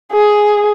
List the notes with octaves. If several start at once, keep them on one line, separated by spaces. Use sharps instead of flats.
G#4